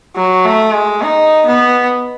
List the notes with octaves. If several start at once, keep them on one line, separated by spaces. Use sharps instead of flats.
F#3
A3
G#3
D#4
B3